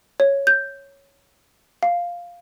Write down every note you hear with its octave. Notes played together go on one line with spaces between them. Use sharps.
C#5
G6
F5